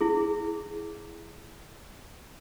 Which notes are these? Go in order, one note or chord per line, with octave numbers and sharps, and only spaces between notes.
E4 G#4